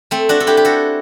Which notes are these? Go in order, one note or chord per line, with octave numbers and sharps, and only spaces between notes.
A3 C4
D4 F#4
A4
E4 G4
G4
F#4 A4